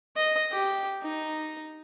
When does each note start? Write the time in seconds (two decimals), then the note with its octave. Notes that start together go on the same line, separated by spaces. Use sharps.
0.17 D#5
0.51 G4
1.02 D#4